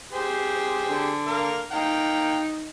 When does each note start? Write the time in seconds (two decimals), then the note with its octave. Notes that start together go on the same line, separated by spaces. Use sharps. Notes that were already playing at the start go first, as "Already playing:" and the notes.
0.13 G4 G#4 C5
0.89 D3
1.28 A#4 F5
1.72 D#4 F5 G5 A#5